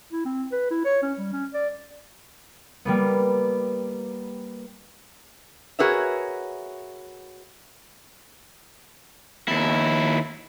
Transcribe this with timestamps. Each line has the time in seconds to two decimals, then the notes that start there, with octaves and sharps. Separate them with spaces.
0.12 E4
0.25 C4
0.52 B4
0.71 E4
0.85 C#5
1.03 C#4
1.18 G3
1.33 C#4
1.54 D5
2.85 G3 A#3 B3
5.79 F#4 G#4 A#4 B4 C#5 E5
9.48 D#2 E4